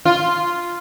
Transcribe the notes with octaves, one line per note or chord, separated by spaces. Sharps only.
F4